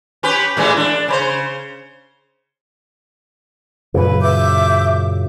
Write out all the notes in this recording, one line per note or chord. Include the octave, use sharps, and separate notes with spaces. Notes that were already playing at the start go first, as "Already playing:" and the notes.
C#4 G4 B4
A2 E3 G#3
D4
C#3 B4 C5
F#2 A#2 C#3 B4
E5 D6 G6